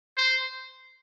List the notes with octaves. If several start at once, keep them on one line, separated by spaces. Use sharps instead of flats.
C5